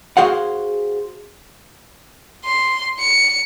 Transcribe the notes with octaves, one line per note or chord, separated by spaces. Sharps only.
F#4 G#4 C5 F5 F#5
C6
C#7